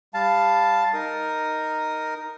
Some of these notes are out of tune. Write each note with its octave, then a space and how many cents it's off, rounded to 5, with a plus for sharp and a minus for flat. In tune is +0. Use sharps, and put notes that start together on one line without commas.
G3 +20 F5 +0 A5 +0
D#4 +0 A#4 +0 D#6 +0